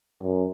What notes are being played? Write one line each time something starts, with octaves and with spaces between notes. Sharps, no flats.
F#2